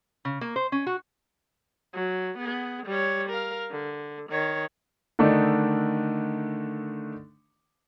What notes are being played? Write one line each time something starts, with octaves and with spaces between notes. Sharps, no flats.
C#3
A#3
C5
C#4
F#4
F#3
B3 G#4
G3 C#5
A#4 F5
D3
D#3 C#5
D3 D#3 A3 D4 D#4